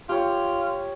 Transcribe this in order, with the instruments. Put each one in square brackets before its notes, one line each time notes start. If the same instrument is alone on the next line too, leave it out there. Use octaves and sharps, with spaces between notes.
[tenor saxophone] F4 [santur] G4 C#5